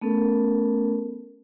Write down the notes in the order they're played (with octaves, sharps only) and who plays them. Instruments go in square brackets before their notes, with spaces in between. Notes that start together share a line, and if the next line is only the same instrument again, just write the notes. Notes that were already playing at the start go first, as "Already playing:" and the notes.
[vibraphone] A3 B3 C#4 A4 A#4